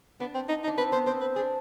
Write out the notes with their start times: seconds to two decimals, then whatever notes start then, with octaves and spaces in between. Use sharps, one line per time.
0.20 B3 D4
0.35 C4
0.49 D#4
0.64 D#4
0.68 D4
0.77 C4 B4
0.92 B3 C5
1.06 C4 C5
1.21 B4
1.36 D4 G#4